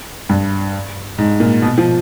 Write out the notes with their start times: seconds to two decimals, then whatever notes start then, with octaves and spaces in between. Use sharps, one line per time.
0.29 G2
1.18 G#2
1.40 A#2
1.62 B2
1.78 F3